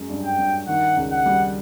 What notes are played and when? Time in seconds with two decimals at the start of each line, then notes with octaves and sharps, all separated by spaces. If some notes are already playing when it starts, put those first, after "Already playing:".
Already playing: F#2 G#3
0.09 G2
0.24 G5
0.38 G2
0.67 D#3 F#5
0.97 C#2
1.11 F#5
1.26 G3